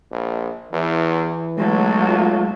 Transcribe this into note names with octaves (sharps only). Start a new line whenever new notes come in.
A#1
E2 E3
B1 F#3 G#3 A3
F4